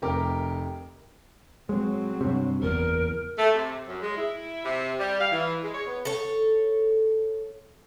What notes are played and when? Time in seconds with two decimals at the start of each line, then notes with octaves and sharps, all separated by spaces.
0.02 F1 C3 G4 A#4 D6
1.69 F#3 G#3 C4
2.21 G2 C3
2.62 F#1 E2 A#4
3.38 A3
3.54 C3
3.87 F#2
4.02 G#3
4.16 E4
4.64 C3
4.99 G3
5.20 F5
5.32 E3
5.62 G#3
5.75 C#5
5.86 B3
6.05 A4 C#5